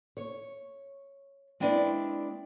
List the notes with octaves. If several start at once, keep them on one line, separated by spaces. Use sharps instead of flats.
C#5
G#3 C4 D4 E4 B4 D5